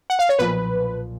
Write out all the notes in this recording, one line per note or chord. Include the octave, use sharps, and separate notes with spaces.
F#5
F5
C#5
B1 A#2 F3 B4